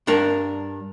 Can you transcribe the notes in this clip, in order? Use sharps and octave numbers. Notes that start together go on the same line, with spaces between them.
G2 D4 A#4